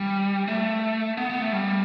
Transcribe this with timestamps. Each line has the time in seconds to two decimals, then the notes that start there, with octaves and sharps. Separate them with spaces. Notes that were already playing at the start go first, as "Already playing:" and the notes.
Already playing: G3
0.48 A3
1.18 B3
1.30 B3
1.41 A3
1.52 G3